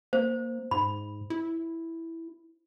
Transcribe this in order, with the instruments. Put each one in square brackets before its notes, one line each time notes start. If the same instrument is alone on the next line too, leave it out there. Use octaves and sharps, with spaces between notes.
[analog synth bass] A#3 [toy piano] C5
[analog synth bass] G#2 [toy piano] B5
[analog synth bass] E4